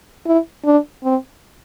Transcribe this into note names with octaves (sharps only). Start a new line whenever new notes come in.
E4
D4
C4